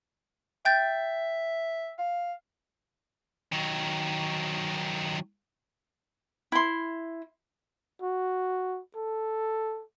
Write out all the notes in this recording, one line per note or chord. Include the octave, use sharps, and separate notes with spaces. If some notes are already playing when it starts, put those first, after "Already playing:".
E5 G5 G6 A6
F5
D#3 F#3
E4 C6
F#4
A4